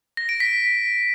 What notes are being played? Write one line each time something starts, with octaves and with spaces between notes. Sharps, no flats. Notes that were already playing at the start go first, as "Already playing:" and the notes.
A#6
D7
B6